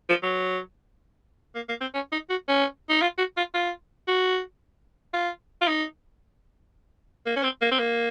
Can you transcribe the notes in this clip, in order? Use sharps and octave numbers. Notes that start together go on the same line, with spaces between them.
F3
F#3
A#3
A#3
C4
C#4
D#4
F#4
C#4
D#4
F4
F#4
F4
F4
F#4
F4
F4
D#4
A#3
C#4
C4
A#3
C4
A#3